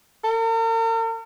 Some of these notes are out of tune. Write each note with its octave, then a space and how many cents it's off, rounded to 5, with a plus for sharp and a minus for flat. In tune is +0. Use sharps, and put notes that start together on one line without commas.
A#4 -45